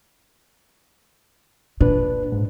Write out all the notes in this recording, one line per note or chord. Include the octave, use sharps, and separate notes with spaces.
A#2 D4 B4
G#2